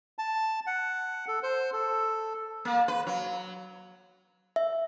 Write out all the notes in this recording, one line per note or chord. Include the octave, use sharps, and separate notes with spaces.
A5
F#5
A4
C5
A4
A#3
B4
F#3
E5